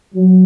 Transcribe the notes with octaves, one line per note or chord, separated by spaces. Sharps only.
F#3